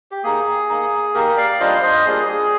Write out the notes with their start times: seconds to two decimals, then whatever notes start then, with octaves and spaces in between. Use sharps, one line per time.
0.11 G4
0.24 A#3 D#4 G#4
0.69 A#3 D#4
1.14 A#3 D#4 G4 A#4
1.37 D5 F5
1.60 G3 D4 F4 C5 D#5
1.83 C5 D#5
2.06 G3 A#3 D4 F4 G#4
2.28 G#4